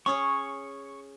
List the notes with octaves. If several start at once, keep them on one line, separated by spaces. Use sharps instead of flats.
C#4 G#4 C#5 C#6